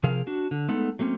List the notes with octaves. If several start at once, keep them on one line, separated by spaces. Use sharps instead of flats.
C3 F3 G#4 A#4 F5
D4 F#4
D3
G#3 A3 B3 D#4 A4 F#5
F#3 A3 A#3 C4 C#4